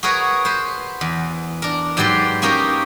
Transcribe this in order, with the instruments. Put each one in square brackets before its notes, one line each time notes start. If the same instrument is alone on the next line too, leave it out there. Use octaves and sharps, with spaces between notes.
[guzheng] F#4 G#4 A#4 B4 C#5
B4 C5
E2
D4 A#4
G#2 F#3 G4 B4 D5 C6
A#3 C#4 D#4 G4 A#4